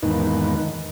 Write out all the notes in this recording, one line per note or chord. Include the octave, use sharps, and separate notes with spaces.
E2 G#2 D#3 A#3 D#4 B4